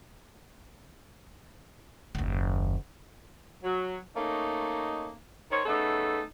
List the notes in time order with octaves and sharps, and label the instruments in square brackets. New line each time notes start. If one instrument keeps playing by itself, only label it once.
[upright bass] F#1 D#2
[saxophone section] F#3
A3 A#3 C#4 D#4
D#3 C5 C#5
C#3 A3 B3 D#4 A4